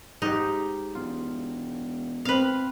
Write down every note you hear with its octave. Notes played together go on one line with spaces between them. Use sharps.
G#2 D#4 G4
E1 F4
C4 B4 F5